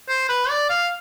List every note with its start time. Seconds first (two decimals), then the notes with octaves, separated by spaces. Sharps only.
0.09 C5
0.29 B4
0.49 D5
0.70 F5